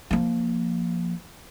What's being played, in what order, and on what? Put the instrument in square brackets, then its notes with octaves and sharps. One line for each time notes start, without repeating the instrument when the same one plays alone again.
[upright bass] F3 A#3